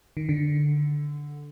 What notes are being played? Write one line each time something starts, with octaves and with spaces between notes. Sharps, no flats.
D#3
D3